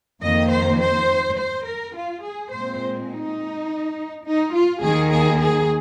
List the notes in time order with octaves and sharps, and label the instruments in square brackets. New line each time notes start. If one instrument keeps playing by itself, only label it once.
[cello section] F2 D#3 A#3 D#5
C5
C5
C5
A#4
F4
G#4
A#2 G#3 C4 C5
D#4
D#4
F4
D#2 D#3 A#3 G#4
G#4
G#4